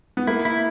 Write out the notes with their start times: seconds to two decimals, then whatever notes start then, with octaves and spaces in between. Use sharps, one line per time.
0.17 B3
0.27 A#3 E4
0.45 E4